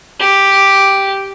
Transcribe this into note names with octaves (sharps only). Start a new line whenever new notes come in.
G4